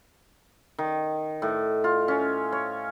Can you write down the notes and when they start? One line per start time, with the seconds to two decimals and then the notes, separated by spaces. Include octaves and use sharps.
0.79 D#3
1.42 A2
1.84 F4
2.08 C#4
2.52 C#5